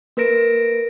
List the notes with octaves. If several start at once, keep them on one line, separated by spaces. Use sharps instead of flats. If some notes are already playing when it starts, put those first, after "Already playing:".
A#3 A#4 B4 A#6 D7